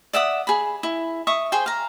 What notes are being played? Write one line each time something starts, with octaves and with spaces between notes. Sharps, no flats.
D5 E5 F#5 D#6
G#4 B5
E4
E5 C#6 D#6
G#4 C5 G5
F5 A#5